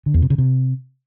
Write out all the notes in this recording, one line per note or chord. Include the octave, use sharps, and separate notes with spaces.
D3
E2
C3
C#3
C3